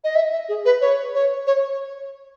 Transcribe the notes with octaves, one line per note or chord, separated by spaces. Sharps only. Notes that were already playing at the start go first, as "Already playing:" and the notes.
D#5
E5
E5
G#4
B4
C#5
C#5
C#5